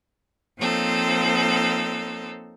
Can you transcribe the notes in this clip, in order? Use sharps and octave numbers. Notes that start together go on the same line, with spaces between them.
F3 A#3 C4 D#4 A4 C#5